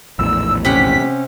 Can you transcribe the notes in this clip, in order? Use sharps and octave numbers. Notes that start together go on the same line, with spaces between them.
A#1 E2 A2 E6
C3 C#4 G4 F#5 B6